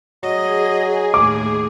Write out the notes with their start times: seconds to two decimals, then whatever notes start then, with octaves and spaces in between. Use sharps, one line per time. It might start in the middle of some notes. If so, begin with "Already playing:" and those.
0.23 F#3 G#4 D#5
1.14 D#2 A2 D6